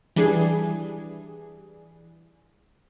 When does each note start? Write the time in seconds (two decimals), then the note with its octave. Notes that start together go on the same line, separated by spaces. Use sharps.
0.16 E3 G3 D4 G#4